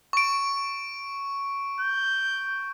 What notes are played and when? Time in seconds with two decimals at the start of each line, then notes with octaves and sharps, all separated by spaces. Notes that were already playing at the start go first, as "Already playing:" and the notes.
0.13 C#6 D7
1.81 G6